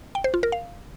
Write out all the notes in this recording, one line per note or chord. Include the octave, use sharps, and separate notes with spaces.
G5
C5
F4
A#4
F5